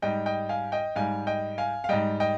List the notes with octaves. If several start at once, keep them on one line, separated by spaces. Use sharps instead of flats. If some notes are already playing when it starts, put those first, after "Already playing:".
G#2 G3 D#5 G5
D#5 G5
F5 G#5
D#5 G5
G#2 G3 F5 G#5
D#5 G5
F5 G#5
F5
G#2 G3 D#5 G5
D#5 G5